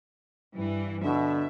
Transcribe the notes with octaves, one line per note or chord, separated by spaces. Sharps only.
G2 E3
B2 D3 E5